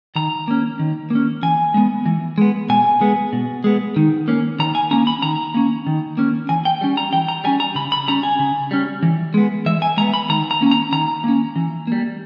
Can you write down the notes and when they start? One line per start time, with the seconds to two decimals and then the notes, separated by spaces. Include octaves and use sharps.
0.16 D#3 A#5
0.48 A#3 C#4
0.79 D#3
1.10 A#3 C#4
1.43 E3 G#5
1.74 G#3 B3
2.06 E3
2.38 G#3 B3
2.69 B2 G#5
3.01 G#3 B3
3.33 B2
3.64 G#3 B3
3.96 D#3
4.28 A#3 C#4
4.59 D#3 A#5
4.75 G#5
4.91 A#3 C#4 A#5
5.07 B5
5.22 D#3 A#5
5.54 A#3 C#4
5.87 D#3
6.17 A#3 C#4
6.49 E3 G#5
6.65 G5
6.81 G3 C#4
6.97 A#5
7.13 E3 G5
7.28 A#5
7.44 G3 C#4 G#5
7.60 A#5
7.75 C#3 B5
7.92 B5
8.07 G3 C#4 A#5
8.23 G#5
8.39 C#3
8.71 G3 C#4
9.03 E3
9.34 G#3 B3
9.66 E3 E5
9.82 G#5
9.97 G#3 A#5
10.01 B3
10.14 B5
10.29 D#3 A#5
10.51 A#5
10.61 A#3 C#4
10.71 A#5
10.92 D#3 A#5
11.24 A#3 C#4
11.56 E3
11.87 G3 A#3